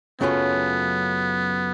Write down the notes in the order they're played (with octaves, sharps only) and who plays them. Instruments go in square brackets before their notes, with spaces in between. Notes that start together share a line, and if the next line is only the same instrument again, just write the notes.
[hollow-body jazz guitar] F#2 C#3 F#3 A3 F4 [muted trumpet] B3